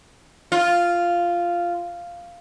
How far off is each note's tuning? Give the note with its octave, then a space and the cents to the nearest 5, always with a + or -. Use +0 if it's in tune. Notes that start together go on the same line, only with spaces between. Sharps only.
F4 -5